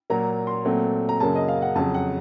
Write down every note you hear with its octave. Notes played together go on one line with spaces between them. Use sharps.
A#2 F#3 A#3 A#5
C6
A#2 F#3 A3 C4
A#5
F#2 C#3 F#3 A#3 A5
D#5
F5
F#5
F2 C#3 F#3 A5
F#5